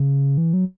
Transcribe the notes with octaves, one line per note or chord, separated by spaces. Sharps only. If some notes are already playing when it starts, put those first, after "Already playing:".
Already playing: C#3
E3
F#3